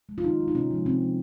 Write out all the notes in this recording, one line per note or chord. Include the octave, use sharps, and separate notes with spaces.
G#3
F4
D#3 D#4
G#3
D#4
C3 C#4
F3 G#3
C3 C4
F3 G#3